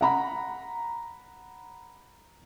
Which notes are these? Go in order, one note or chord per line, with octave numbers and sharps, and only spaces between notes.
F#5 A#5 B5